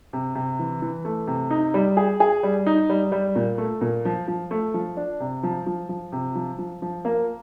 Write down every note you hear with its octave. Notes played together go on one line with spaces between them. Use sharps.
C3
C3
E3
E3
A3
C3
D#4
G3
G#4
G#4
G3
D#4
G3
G3
A#2
A3
A#2
F3
F3
A3
F3
D4
C3
F3
F3
F3
C3
F3
F3
F3
A#3